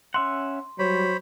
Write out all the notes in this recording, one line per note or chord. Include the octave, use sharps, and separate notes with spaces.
C#4 E5 F#5 C6
F#3 G3 C5 C#5 B5